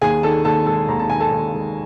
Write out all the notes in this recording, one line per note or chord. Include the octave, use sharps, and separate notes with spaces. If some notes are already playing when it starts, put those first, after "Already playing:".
D#2 G#4 G#5
D#3 A4 A5
D#2 A4 A5
G#3 A4 A5
D#2 A#5
A5
D#3 G#5
A4 A5
D#2
G#3